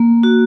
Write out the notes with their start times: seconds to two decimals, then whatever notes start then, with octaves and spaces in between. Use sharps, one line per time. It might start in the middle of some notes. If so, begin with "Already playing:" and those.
Already playing: A#3
0.23 F#4